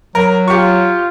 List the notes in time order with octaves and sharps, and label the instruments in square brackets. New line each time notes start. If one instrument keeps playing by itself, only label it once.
[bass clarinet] F#3 [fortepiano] A#4
[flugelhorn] F4 [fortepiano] G4 C#6